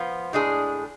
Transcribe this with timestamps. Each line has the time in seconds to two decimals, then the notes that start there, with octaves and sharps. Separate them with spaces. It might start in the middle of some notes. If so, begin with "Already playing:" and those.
Already playing: F3 B3 F4
0.33 A2 G#3 D4 G#4